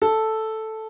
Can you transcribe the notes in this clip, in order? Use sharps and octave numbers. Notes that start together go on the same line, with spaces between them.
A4